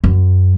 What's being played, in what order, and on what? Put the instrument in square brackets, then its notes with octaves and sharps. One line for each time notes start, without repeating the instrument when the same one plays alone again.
[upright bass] F#2